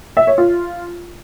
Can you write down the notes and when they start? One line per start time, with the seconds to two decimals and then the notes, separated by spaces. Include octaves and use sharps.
0.17 E5
0.27 C#5
0.38 F4